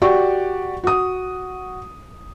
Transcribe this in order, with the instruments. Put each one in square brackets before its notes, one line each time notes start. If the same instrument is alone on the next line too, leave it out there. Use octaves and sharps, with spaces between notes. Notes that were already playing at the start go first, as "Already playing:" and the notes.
[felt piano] F#4 G4 D5 C#6
F#4 D#6